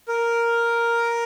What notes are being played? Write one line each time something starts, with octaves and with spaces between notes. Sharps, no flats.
A#4